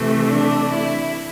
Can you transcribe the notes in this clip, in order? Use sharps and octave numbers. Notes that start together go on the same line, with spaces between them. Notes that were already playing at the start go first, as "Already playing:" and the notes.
Already playing: C3 E3 A3
D4
E4